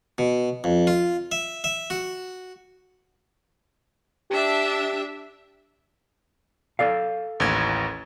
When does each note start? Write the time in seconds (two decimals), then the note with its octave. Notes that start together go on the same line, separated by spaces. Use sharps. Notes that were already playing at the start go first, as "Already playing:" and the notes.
0.18 B2
0.64 F2
0.87 F4
1.32 E5
1.64 E5
1.90 F#4
4.30 D4 G4 E5
6.79 A4 D5 F5
7.40 A1 D#2 G#6